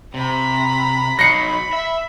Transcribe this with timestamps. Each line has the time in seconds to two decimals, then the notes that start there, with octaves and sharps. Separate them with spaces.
0.14 C3 A#5 B5
1.19 F#3 D#4 B5 A#6 C7 C#7
1.73 E5